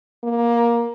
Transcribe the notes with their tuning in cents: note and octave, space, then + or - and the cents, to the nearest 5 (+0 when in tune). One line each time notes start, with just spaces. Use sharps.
A#3 +15